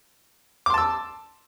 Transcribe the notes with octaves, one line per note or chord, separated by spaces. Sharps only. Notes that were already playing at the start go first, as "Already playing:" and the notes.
A5 C6 D6 E6